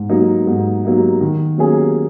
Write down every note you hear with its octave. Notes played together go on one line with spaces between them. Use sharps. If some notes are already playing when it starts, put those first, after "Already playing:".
Already playing: G#2
F#3 A#3 D#4
G#2
F#3 A#3 D#4
D#3
F#3 A#3 C#4 G#4